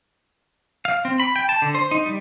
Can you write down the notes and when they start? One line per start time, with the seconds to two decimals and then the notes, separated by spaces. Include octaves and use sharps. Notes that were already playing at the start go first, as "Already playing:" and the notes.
0.85 F5
1.05 C4
1.20 B5
1.36 G5
1.49 A5
1.62 D3
1.75 C5
1.91 D#4
2.06 G3